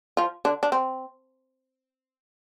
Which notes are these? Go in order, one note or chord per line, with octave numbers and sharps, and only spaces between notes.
F3 F4
D3 D4
D4
C4